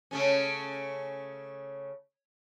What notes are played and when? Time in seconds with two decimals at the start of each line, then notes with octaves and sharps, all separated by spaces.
0.11 C#3 A3 C#4